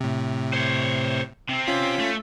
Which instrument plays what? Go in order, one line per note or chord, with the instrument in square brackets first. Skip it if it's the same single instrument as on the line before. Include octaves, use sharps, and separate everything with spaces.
[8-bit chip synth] A2 C3
[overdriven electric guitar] C5 C#5
C3 C4
[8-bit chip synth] C#4 F4 B6
[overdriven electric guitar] A3